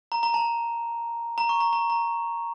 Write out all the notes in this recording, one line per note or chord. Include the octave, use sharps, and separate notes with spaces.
A#5
A#5
A5
A#5
C#6
A#5
A#5
A#5